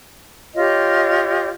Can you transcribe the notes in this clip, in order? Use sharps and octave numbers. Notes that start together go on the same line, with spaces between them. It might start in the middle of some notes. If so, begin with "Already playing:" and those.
F4 G4 C#5 D#5